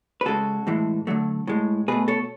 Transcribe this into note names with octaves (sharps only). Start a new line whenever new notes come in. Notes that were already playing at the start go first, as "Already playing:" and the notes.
B4
C#3 G#3 F#4 A4
A2 E3 G#3
D3 F#3 A3
A2 G#3
B2 A3 G#4 B4
A4 C#5